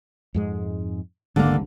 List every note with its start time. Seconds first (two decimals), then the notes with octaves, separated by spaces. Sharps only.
0.34 F2 G#2 G#3
1.36 G#1 C#2 G2 D3 A#3